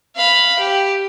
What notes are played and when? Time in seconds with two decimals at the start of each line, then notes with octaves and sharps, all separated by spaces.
0.15 F5 B5
0.59 G4